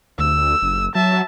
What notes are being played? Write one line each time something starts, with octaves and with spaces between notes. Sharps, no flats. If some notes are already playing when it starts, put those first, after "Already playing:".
D2 E6
F#1
F#3 E5 A5